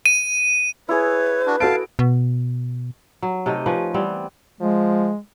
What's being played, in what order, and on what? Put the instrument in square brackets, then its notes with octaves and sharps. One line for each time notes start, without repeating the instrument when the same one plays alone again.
[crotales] D#7
[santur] E4 G#4 [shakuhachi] B4 [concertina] C#5
[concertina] D4 F#4
[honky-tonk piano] F#4 A4 D7 [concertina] F5 A5
[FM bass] B2
[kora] F#3
C3 A3 D#4 D#5
F3 C#4 B4
E3 G3 B3 C4
[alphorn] F3 [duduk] G#3